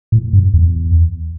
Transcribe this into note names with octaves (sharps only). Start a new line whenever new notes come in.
A2
G2
E2